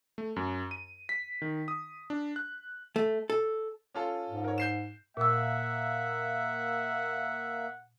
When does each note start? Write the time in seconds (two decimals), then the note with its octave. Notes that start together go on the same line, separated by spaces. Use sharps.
0.18 A3
0.36 F#2
0.71 D#7
1.09 B6
1.42 D#3
1.68 D#6
2.10 D4
2.36 F#6
2.96 A3
3.30 A4
3.94 C#4 F4 A4
4.29 G#2
4.44 A#4 C#5
4.58 G6 C7 E7
5.17 A#2 A#3 E5 F#5 E6